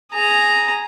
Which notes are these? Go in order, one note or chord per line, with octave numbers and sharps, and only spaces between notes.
G#4 A#5